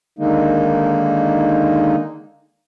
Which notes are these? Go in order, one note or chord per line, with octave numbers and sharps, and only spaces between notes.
D3 D#3 G#3 A#3 D#4